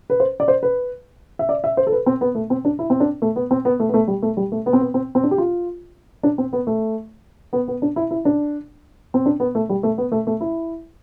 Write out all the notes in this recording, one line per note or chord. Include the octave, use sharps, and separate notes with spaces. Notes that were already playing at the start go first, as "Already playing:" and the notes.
B4
C5
D5
C5
B4
E5
D5
E5
C5
A4
B4
C4
B3
A3
C4
D4
E4
C4
D4
A3
B3
C4
B3
A3
B3
A3
G3
A3
G3
A3
B3
C4
B3
C4
C4
D4
G4
F4
D4
C4
B3
A3
B3
B3
D4
E4
E4
D4
C4
D4
B3
A3
G3
A3
B3
A3
A3
E4